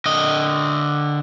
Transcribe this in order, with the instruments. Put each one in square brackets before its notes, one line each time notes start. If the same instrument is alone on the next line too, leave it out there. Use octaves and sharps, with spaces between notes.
[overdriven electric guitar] D3 D#5